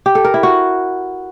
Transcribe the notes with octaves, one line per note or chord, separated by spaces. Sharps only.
G4
A4
A#4
E4
F#4